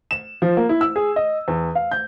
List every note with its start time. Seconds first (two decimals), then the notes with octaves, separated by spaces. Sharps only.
0.11 E7
0.42 F3
0.57 A#3
0.69 E4
0.81 E6
0.96 G#4
1.16 D#5
1.48 E2
1.75 F5
1.91 G6